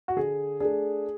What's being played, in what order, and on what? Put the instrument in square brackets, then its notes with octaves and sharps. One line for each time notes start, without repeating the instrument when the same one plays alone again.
[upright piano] F#4
D3 G#4
A3 D4 G#4